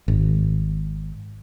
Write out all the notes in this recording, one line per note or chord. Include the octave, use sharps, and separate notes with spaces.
G#1